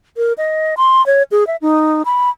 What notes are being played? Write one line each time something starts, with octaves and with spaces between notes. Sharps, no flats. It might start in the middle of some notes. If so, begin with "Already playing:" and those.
A#4
D#5
C6
C#5
G#4
E5
D#4
B5